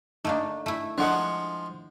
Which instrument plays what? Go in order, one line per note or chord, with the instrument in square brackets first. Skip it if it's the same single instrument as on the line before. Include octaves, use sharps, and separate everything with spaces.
[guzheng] A3 A#3 D4 [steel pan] D#4
[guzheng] A3 E4
[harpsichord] F3 G#3 [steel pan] D4 F#5